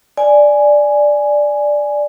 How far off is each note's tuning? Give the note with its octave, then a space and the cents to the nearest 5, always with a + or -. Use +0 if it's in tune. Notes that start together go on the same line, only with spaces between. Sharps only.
D5 +0 G#5 +0